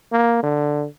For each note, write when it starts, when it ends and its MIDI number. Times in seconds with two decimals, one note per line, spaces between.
0.12 0.38 58
0.43 0.86 50